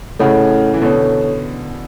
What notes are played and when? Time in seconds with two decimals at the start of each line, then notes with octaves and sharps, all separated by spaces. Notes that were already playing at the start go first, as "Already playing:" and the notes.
0.19 A2 C#3 A3 E4 A4 C#5 F#5
0.74 E3
0.81 B2 D3 E4 A4 C#5